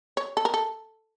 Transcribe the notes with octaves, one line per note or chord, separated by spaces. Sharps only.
C#5
A4
A#4
A4